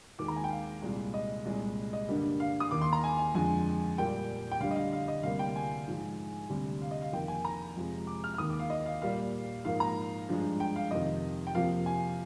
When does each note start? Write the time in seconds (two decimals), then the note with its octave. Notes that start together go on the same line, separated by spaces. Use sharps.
0.19 D#2 D#3 G#3 D6
0.28 A#5
0.36 G#5
0.44 G5
0.50 F5
0.82 C2 A#2 G#3
1.14 D#5
1.45 C2 A#2 G#3
1.93 D#5
2.09 G2 D3 G3 A#3
2.40 F5
2.60 D#6
2.71 D#2 D#3 A#3 D6
2.81 C6
2.93 A#5
3.04 G#5
3.19 G#5
3.35 F2 D3 G#3 G#5
3.98 A#2 G3 A#3 G5
4.52 G5
4.60 D2 D3 G3 F5
4.71 D#5
4.76 F5
4.93 F5
5.08 D#5
5.23 D2 C3 G3 A#3 F5
5.39 G5
5.56 G#5
5.87 G#2 F3 G#3
6.50 D2 C3 G3
6.81 F5
6.91 D#5
7.02 F5
7.13 F2 D#3 A#3 G5
7.28 G#5
7.45 A#5
7.76 F2 C3 F3 G#3
8.07 D6
8.24 F6
8.34 F6
8.38 D#2 D#3 A#3 D#6
8.50 D6
8.59 F5
8.70 D#5
8.86 F5
9.02 A#2 G3 A#3 F5
9.65 G#2 F3 A#3 F5
9.80 A#5
10.29 G2 F3 G#3
10.60 G5
10.76 F5
10.91 F2 C3 D#3 D#5
11.47 G5
11.55 F2 C3 F3 A#3 F5
11.86 G#5